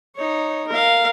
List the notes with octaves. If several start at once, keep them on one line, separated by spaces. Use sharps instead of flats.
D#4 C#5
A#4 F5